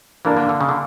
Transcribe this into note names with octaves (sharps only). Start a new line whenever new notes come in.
E3 A#3 D4 A#4
D3
D3
C#3
D3